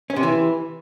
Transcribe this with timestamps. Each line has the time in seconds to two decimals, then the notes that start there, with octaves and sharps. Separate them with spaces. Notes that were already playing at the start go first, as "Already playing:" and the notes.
0.10 C#4
0.16 C3
0.23 E3